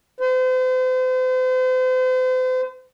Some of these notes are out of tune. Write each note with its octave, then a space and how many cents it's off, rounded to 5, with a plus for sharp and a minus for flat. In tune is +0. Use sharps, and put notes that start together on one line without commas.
C5 -40